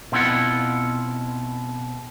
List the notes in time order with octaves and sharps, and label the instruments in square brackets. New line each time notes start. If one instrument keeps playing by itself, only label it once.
[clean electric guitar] B2 C4 E4 F4 F#5